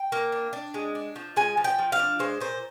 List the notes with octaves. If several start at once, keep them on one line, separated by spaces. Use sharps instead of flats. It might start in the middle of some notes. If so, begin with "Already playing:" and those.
Already playing: G5
A#3
D4
D4
G#3
D4
F3
G#3 G#5
F3
G5
F3
F5
D4
G#3 C5
A#2 C5